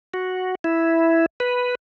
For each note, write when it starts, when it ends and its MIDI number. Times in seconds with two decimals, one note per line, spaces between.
0.14 0.55 66
0.64 1.26 64
1.40 1.75 71